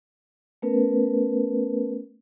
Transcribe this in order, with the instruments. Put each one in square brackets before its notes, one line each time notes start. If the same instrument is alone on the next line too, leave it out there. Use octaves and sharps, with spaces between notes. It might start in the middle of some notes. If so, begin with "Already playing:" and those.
[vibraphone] A3 B3 C#4 A#4 B4